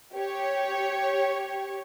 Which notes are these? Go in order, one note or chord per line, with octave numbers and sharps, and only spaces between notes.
G4 C#5